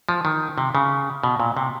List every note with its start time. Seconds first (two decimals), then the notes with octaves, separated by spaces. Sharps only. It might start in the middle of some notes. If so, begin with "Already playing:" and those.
0.09 F3
0.25 D#3
0.58 C3
0.75 C#3
1.24 B2
1.40 A#2
1.57 C3